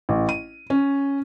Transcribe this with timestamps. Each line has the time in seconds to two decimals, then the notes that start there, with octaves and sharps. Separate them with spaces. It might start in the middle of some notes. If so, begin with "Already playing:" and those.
0.09 A1
0.29 D#7
0.70 C#4